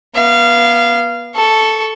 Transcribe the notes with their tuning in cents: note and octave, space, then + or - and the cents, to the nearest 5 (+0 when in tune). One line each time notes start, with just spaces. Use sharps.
B3 -30 F5 -20
A4 +0 C#6 +10